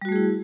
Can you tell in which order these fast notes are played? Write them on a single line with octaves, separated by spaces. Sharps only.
G3 F#4 A3 G#4 E4